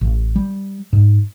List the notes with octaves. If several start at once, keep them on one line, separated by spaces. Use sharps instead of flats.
A1
G3
G#2